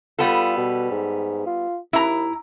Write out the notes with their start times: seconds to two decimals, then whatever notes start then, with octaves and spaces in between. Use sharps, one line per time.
0.19 G3 B3 F4 A4
0.57 B2
0.91 G#2
1.46 F4
1.93 D#2 E4 A#5